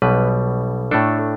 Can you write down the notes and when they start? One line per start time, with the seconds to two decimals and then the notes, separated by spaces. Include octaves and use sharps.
0.02 B1 B2 G3 B4
0.91 A2 A3 D4 A4